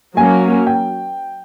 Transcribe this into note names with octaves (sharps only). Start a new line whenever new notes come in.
F#3 A#3 C#4 G#5
G5